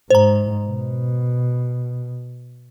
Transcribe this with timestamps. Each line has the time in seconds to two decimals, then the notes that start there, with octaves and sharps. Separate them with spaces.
0.10 G#2 C5 A#5
0.67 B2